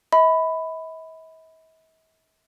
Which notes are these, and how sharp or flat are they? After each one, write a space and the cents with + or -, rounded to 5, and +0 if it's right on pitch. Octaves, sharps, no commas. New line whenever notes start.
E5 -45 B5 +15